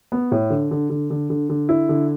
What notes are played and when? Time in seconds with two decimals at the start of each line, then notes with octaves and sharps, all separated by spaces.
0.12 B3
0.32 A2
0.50 D3
0.71 D3
0.90 D3
1.10 D3
1.30 D3
1.49 D3
1.69 E4
1.89 D3